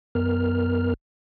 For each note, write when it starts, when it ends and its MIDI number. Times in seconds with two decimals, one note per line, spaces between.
0.15 0.94 42
0.15 0.94 59
0.15 0.94 70
0.15 0.94 89